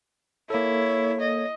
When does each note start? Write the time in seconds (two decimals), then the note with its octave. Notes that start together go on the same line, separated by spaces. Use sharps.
0.50 A#3 E4 A4 C#5
1.21 D#5